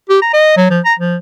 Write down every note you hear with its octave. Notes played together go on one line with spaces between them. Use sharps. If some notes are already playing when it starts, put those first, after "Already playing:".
G4
A#5
D#5
F#3
F3
A#5
F3